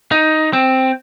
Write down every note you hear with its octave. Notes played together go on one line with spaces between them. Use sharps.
D#4
C4